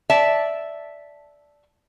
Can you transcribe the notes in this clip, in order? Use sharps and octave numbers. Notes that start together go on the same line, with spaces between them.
D5 E5 A5